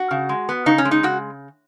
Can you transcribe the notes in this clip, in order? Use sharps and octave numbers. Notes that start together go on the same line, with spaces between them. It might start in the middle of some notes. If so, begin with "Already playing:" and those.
Already playing: F#4
C#3
G#3
B3
C#3 D#4
C#4
G#3
D#4
C#3 F#4